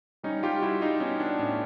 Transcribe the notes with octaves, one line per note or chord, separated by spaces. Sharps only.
G3 C#4 D#4
G3 F4 G4
G3 E4 F#4
G3 D#4 F4
B3 C#4 D#4
B3 D4
A2 C#4